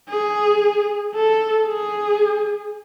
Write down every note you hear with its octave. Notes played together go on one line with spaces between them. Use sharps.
G#4
A4
G#4